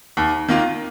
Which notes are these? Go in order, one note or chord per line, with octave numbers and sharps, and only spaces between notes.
D#2
D#3 A#3 F4